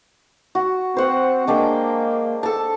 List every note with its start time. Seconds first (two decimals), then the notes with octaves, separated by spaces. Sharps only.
0.55 F#4
0.97 C4 C5 F#5
1.47 G#3 A#3 D4 G5
2.43 A4 A5